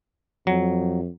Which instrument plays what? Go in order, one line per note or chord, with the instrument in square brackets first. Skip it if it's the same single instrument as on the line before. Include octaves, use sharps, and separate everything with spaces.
[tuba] F2 [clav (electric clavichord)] F#3